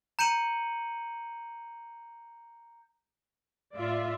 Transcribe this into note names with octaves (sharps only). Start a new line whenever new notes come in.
A#5 G6 C#7 D#7 F#7
A2 F4 D5 E5 F5